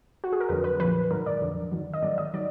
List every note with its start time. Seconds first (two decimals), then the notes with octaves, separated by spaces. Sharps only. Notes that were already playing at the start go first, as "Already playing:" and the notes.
0.24 F#4
0.32 G#4
0.40 A#4
0.49 F2 D3 F#3 B4
0.64 B4
0.80 A#2 F3 B4
1.11 G#2 D#3 F#3 A#4
1.26 D5
1.41 F2 D3 F3
1.72 G#2 D#3 F#3
1.94 D#5
2.02 G#2 D#3 F#3 D5
2.18 D#5
2.34 D#3 F#3 D5